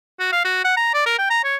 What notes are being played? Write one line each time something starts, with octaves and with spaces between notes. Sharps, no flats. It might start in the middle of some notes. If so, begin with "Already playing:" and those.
F#4
F5
F#4
F#5
A#5
D5
A#4
G5
A#5
C#5